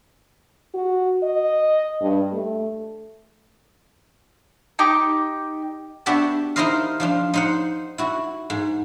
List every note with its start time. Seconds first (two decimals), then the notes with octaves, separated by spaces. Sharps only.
0.74 F#4
1.23 D#5
2.01 G2
2.33 A3
4.79 D#4 G4 D6
6.06 B3 D4 F#4 G4 E5 A5
6.56 D#4 E4 A#4 C5 D#5 F5
7.00 F3 D4 F4
7.34 D#4 C5 F#5
7.98 E4 F#4
8.50 G#2